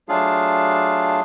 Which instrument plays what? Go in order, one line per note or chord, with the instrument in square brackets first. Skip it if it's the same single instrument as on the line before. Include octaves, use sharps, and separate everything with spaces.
[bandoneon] F#3 A3 D4 F4 G#4 F5